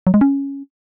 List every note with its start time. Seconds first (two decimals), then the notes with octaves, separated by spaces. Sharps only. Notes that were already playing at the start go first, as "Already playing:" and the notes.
0.07 F#3
0.14 G#3
0.21 C#4